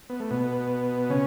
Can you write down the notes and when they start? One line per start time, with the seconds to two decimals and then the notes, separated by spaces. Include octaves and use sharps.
0.10 B3
0.20 A3
0.31 B2 B3
1.10 C#3 C#4